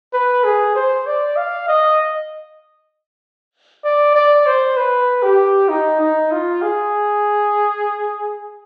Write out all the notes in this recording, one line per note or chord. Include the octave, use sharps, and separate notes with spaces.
B4
G#4
C5
D5
F5
D#5
D5
D5
C5
B4
G4
D#4
D#4
F4
G#4